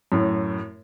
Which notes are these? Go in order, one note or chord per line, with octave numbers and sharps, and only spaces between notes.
F#2 A2